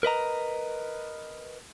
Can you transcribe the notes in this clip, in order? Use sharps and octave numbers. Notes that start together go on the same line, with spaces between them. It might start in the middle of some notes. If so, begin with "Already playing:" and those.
A#4 B4 D#5 A#5